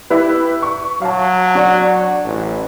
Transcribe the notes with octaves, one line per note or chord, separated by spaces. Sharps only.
E4 G4 B4
C#6
F#3 F5 A5
D4 F#4
A1